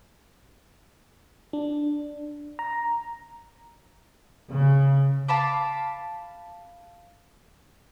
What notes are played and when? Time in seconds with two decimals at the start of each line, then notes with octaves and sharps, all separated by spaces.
1.53 D4
2.59 A#5
4.51 C#3
5.28 F5 A5 B5 D6